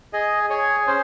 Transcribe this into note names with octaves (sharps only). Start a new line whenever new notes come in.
G#4 D#5
G#4 C#5
C#4 C5